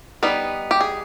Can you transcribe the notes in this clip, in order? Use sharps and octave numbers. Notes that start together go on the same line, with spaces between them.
G3 B3 D#4 B4
G4
G#4